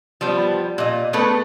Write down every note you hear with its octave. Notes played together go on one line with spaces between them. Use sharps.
F3 G3 B3
A#2 D#5
A3 B3 G#4 A4 B4